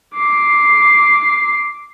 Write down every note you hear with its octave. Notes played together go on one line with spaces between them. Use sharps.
D6 C7